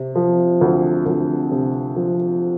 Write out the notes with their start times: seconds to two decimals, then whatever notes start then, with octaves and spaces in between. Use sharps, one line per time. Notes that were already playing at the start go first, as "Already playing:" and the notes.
Already playing: C3
0.15 F3
0.61 D2
1.06 D2
1.52 C3
1.96 F3